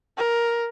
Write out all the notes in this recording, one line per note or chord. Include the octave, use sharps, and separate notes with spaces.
A#4